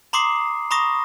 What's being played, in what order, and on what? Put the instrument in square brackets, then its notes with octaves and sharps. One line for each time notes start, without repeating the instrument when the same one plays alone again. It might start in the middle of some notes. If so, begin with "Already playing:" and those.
[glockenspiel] A#5 C6 D6 D#6 C7
A#5 B5 C#6 D#6 A#6